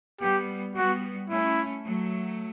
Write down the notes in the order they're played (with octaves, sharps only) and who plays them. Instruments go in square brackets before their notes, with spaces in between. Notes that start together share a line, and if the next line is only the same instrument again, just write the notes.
[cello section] G3 B3 [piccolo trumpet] G4
[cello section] G3 B3 [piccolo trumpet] F#4
[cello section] A3 C#4 [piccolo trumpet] E4
[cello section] F#3 A3